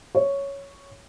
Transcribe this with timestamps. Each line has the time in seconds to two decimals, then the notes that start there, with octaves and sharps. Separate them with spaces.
0.15 C#5